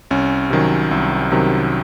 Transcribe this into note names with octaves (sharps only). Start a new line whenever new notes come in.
C2 C#4
C3 D#3 F#3
C2
C3 D#3 F#3